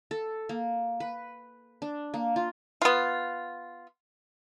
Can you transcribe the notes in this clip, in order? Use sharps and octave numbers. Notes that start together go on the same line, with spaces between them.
A4
A#3
B4
D4
A#3
F4
B3 F4